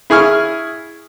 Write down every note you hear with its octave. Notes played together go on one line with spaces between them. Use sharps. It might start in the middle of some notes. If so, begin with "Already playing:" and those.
E4 G#4 G#5 C#6 F6